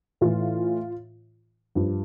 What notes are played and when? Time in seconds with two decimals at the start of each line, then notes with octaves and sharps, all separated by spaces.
0.21 A2 E3 F4
1.75 G2 F3